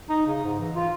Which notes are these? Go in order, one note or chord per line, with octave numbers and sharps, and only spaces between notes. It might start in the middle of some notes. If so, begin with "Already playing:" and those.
D#4
C#3
G#2
E3
F4